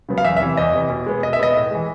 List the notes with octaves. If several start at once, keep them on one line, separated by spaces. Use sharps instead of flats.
C#3 F#3 B3
F5
E2 E5
E5
C3 E3
E2 D#5
C3 E3
B2
G#3 B3
B2 D#5
E5
G#3 B3 D#5
A2
E3 G#3